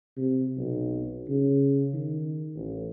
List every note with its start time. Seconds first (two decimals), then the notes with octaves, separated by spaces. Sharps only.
0.17 C3
0.57 B1
1.29 C#3
1.94 D#3
2.55 A1